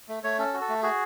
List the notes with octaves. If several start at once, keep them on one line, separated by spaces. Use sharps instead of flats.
A3
A3 C#5
C#4 A4
F#4
A4
A3
F#4 G#4